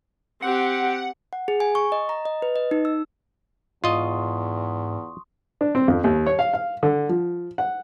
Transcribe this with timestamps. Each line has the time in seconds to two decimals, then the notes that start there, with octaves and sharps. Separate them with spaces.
0.42 C4 G4 F#5
1.33 F#5
1.48 G#4
1.60 G#5
1.75 C#6
1.92 D#5
2.09 A#5
2.26 D#5
2.42 B4
2.56 D#5
2.71 D#4
2.85 E6
3.84 E2 G#2 F4 D#5 C6 C#6 D#6
5.61 D4
5.75 C4
5.88 F2
6.04 D#2
6.26 C#5
6.39 F5
6.53 F5
6.83 D3
7.09 F3
7.58 F#5